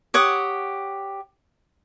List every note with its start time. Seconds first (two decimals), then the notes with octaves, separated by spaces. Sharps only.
0.14 G4 C#5 F#5 D#6